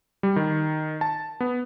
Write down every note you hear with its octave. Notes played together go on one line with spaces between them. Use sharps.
G3
D#3
A5
B3